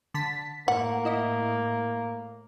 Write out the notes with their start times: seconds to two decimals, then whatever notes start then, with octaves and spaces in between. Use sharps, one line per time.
0.14 D3 A5 B6
0.68 A2 A#3 F#5
1.05 E4 D#5